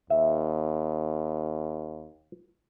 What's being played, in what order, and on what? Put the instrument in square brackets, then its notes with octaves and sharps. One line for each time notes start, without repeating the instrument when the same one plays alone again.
[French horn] D#2 [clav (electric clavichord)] E5